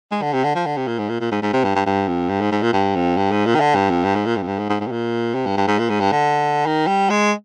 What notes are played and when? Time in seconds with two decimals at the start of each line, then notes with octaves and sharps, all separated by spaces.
0.11 G#3
0.22 D3
0.33 C3
0.44 D3
0.55 F3
0.66 D3
0.77 C3
0.88 A#2
0.98 G#2
1.09 A#2
1.21 A#2
1.32 G#2
1.42 G#2
1.53 C3
1.64 G2
1.75 G2
1.86 G2
2.08 F2
2.29 G2
2.41 G#2
2.52 G#2
2.62 A#2
2.73 G2
2.95 F2
3.17 G2
3.31 G#2
3.46 A#2
3.55 D#3
3.60 D3
3.75 G2
3.90 F2
4.04 G2
4.15 G#2
4.26 A#2
4.37 G2
4.42 F2
4.47 G2
4.59 G#2
4.69 G#2
4.80 G#2
4.87 C3
4.91 A#2
5.34 C3
5.46 G2
5.57 G2
5.68 G#2
5.79 A#2
5.89 G#2
6.00 G2
6.12 D3
6.66 D#3
6.87 G3
7.10 G#3